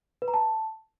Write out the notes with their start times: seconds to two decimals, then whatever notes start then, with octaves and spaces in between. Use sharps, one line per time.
0.22 B4
0.28 A#5
0.34 A5